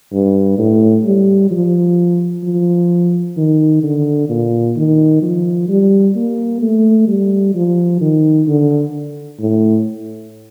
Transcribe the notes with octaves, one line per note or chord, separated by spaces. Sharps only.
G2
A2
G3
F3
F3
D#3
D3
A#2
D#3
F3
G3
A#3
A3
G3
F3
D#3
D3
A2